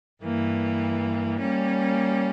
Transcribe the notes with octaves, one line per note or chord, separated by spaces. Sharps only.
G2 E3 A#3
G3 A#3 C#4